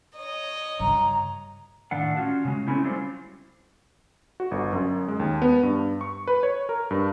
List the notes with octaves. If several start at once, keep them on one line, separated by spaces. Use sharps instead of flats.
C#5 D#5
G2 C#3 A#5
A2 D#3 D4 F5 F#5
C#4 F4 F#4
C#3 G3 G#3
A3 C4 C#4 E4 G4
F#3 G3 E4 F4 C5
F#4
G1
F#2
G#3
D#2
B3
G2
C#6
B4
C#5
A#4
G2